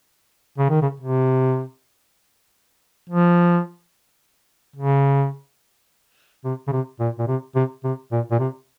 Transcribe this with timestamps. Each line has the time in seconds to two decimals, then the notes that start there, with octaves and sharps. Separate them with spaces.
0.58 C#3
0.70 D#3
0.82 C#3
1.00 C3
3.09 F3
4.76 C#3
6.45 C3
6.67 C#3
6.72 C3
7.00 A#2
7.19 A#2
7.28 C3
7.55 C3
7.84 C3
8.12 A#2
8.31 A#2
8.39 C3